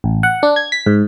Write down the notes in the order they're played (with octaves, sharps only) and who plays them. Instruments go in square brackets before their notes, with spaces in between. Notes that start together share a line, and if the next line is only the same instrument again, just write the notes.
[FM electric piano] A1
F#5
D4
G#6
B6
G#2